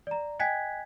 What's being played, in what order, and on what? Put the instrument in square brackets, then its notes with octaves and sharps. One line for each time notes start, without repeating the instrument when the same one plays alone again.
[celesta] D5 A#5
D#5 G5 G#5 F#6 G#6 B6